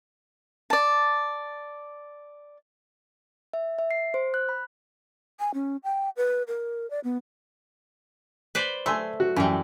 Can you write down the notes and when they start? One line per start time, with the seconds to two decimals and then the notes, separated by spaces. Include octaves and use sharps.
0.70 D5 A5
3.53 E5
3.79 E5
3.91 C7
4.14 C5
4.34 F#6
4.49 B5
5.39 G#5
5.54 C#4
5.84 G5
6.17 B4
6.48 A#4
6.91 D5
7.04 B3
8.55 B4 C5 D5
8.86 A3 G#5 C6 E6
9.20 F#4
9.36 F#2 E3 G3